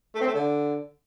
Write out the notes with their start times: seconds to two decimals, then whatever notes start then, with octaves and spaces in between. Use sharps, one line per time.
0.14 A3
0.21 C4
0.27 A3
0.34 D3